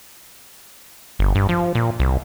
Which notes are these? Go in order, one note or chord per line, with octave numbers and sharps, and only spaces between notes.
G1
G2
F3
A#2
C2